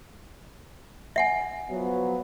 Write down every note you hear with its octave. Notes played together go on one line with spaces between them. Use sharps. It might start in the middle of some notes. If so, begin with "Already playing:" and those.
E5 F#5 G#5
F3 F#3 B3